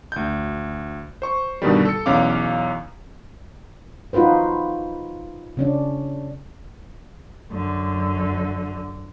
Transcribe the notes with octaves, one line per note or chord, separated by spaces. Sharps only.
D2 G6
C5 C#6
G2 B2 D3 D#3 G3
A4 C#7
B1 E2 C#4 F5 D6
D#4 F4 F#4 B4 C5
C#3 C#4 D4
F#2 D3